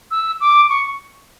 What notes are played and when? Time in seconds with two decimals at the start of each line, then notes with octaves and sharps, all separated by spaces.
0.11 E6
0.41 D6
0.69 C#6